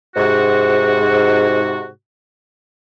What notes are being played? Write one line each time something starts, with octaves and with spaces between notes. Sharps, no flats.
G#2 C3 F#4